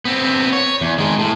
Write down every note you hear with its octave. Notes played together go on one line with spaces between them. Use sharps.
B3 C4
C#5
E2
D#3 G#3
A2